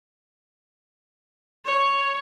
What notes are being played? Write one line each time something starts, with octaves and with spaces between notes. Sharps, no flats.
C#5